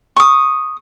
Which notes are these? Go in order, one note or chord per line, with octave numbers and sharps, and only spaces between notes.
C#6 D#6